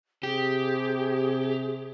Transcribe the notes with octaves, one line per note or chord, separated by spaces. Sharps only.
C3 G4 G#4